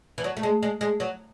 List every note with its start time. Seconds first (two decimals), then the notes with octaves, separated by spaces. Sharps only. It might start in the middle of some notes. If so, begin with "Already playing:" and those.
0.18 E3
0.24 F#3
0.37 A3
0.43 G#3
0.63 G#3
0.81 G#3
1.00 F#3